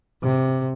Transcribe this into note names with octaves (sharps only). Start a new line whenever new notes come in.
C3